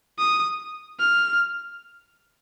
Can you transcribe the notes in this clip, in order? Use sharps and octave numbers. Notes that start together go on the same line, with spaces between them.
D#6
F6